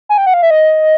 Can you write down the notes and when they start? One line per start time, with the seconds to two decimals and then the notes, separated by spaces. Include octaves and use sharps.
0.09 G#5
0.18 G5
0.26 F#5
0.34 F5
0.43 E5
0.51 D#5